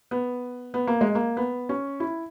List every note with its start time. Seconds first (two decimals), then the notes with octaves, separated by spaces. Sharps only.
0.11 B3
0.74 B3
0.87 A#3
1.01 G#3
1.15 A#3
1.37 B3
1.69 C#4
2.00 E4